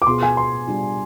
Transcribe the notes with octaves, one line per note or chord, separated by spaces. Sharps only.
D6
B2 B3 F4 G#4 C6
G#5
C6
G3 D4 F4